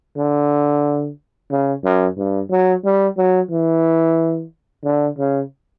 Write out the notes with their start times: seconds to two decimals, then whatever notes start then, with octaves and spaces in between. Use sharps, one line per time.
0.17 D3
1.50 C#3
1.84 F#2
2.17 G2
2.50 F#3
2.84 G3
3.17 F#3
3.51 E3
4.84 D3
5.18 C#3